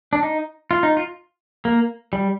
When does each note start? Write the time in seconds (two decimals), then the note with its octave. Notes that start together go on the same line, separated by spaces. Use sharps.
0.13 D4
0.23 D#4
0.71 F4
0.83 D#4
0.97 F4
1.65 A#3
2.13 G3